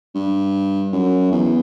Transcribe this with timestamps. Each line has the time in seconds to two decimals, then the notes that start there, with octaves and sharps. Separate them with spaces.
0.15 G2
0.93 F#2
1.32 E2